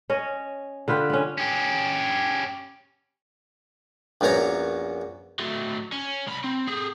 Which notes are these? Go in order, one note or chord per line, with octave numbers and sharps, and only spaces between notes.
C#4 C#5 D#5
D3 F4 B4 G5
B3 C#4
C#4 G4
A#1 F#2 B3 C#5 A#5
F#3 A3
C#4
C2 B5
C4
G4 G#4